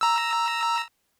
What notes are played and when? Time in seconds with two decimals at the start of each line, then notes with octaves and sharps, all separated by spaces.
0.01 A#5 E6